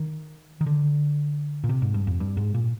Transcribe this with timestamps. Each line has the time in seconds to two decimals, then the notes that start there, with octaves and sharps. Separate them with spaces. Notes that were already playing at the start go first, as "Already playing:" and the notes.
Already playing: D#3
0.61 D#3
0.66 D3
1.64 A#2
1.69 C3
1.82 G#2
1.94 G2
2.07 F2
2.20 G2
2.37 G#2
2.54 A#2